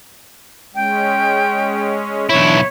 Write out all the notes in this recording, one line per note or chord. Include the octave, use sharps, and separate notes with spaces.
G#3 C#4 G5
B1 E3 D4 E4 C#5